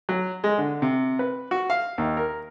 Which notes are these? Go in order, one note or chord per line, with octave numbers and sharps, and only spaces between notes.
F#3
G#3
D3
C3
B4
F#4
F5
D#2
A#4